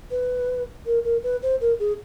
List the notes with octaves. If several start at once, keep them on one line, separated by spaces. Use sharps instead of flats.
B4
A#4
A#4
B4
C5
A#4
G#4